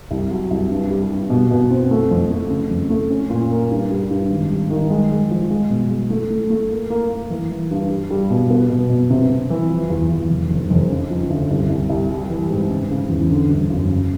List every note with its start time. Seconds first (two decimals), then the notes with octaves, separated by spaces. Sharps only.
0.11 C2
0.30 F#3
0.51 C2
0.70 G2
0.90 G3
1.11 G2
1.30 B2
1.51 B2
1.70 C4
1.91 A3
2.11 F2
2.31 A3
2.50 C#3
2.70 F2
2.90 A3
3.10 C#4
3.30 A#2
3.51 A#3
3.71 G2
3.91 G3
4.10 G2
4.30 G#1
4.50 G3
4.70 D#3
4.90 G#3
5.11 G#3
5.31 F3
5.51 G#3
5.70 B2
5.90 G#3
6.10 A3
6.30 A3
6.50 A3
6.71 A#3
6.90 A#3
7.10 A#3
7.30 E3
7.50 E3
7.71 G2
7.90 G3
8.10 G3
8.30 B2
8.50 B3
8.70 B2
8.90 B2
9.10 C3
9.30 C3
9.50 E3
9.70 F3
9.90 E2
10.11 E2
10.30 F1
10.50 F1
10.70 F1
10.90 C#3
11.10 F3
11.30 D2
11.50 C2
11.70 C2
11.89 C2
12.10 G3
12.30 E3
12.50 G#2
12.70 C#3
12.91 C#3
13.10 E2
13.30 D3
13.50 G1
13.70 F#2
13.90 C#3